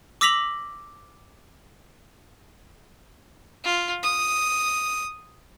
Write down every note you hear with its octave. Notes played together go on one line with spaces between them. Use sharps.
D6 E6 A#6 B6 F7 F#7
F4
D#6